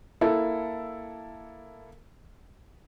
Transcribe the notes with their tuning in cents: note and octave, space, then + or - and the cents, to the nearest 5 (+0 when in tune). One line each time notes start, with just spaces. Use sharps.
A#3 +0 E4 +0 A4 +0